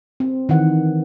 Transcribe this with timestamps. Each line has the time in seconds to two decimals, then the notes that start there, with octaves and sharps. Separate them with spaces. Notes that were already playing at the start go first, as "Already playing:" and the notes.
0.20 C4
0.49 D#3 E3 F#5